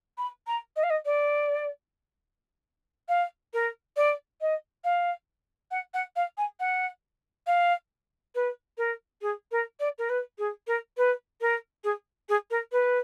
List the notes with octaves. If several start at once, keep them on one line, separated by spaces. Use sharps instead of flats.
B5
A#5
D#5
F5
D#5
D5
F5
A#4
D5
D#5
F5
F#5
F#5
F5
G#5
F#5
F5
B4
A#4
G#4
A#4
D5
A#4
B4
G#4
A#4
B4
A#4
G#4
G#4
A#4
B4